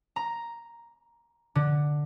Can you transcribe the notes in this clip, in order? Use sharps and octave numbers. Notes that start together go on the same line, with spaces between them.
A#5
D3